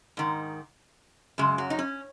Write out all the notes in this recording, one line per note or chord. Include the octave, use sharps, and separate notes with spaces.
G#2 D#3
F#2 C#3 G#3
F#3
D#4
C#4